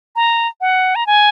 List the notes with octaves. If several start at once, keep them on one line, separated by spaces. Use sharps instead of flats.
A#5
F#5
A#5
G#5